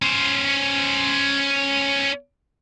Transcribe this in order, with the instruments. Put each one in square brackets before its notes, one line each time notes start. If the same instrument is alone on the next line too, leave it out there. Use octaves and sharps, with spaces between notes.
[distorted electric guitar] C#4 C5